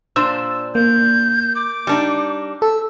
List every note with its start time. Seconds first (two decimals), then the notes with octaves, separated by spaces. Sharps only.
0.16 A#2 D4 C5 E6
0.75 A#3 G6
1.55 D6
1.87 G3 D4 D#4
2.62 A4 E6